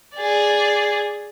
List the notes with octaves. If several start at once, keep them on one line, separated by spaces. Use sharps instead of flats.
G#4 D5